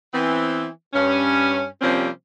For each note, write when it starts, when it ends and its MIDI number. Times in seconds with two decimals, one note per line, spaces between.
0.13 0.67 52
0.13 0.67 59
0.13 0.67 60
0.94 1.65 43
0.94 1.65 61
1.82 2.09 48
1.82 2.09 53
1.82 2.09 55
1.82 2.09 58
1.82 2.09 60
1.82 2.09 61